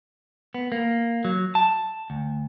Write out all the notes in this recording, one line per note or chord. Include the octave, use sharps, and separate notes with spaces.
B3
A#3
F#3
A5
D2